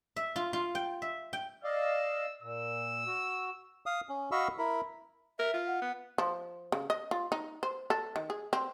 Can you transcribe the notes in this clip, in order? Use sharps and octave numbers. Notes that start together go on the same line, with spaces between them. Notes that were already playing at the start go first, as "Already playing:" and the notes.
E5
F4
F4
G5
E5
G5
D5 D#5 F5 E6
A#2 E6
F#4
F5 D#6
C#4
F#4 D#5 F5 B5 C#6 E6
E4 A#4 B5
A#4 E5
F4
F#5
B3
F3
C#3
D#5
F4
D#4
C5
A4
D#3
G#4
C4